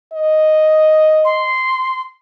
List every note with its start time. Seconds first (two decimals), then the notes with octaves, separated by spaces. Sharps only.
0.13 D#5
1.25 C6